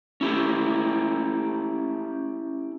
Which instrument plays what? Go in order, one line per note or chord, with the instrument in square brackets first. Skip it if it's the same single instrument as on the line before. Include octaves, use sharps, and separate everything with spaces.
[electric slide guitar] C#4 E4 G4